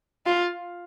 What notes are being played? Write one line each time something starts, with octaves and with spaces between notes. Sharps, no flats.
F4